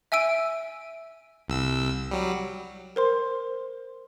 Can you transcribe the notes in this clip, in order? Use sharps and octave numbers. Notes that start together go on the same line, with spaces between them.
E5 G#5 E6 D7 D#7
C2 E6
F#3 G3
A#4 C5 C6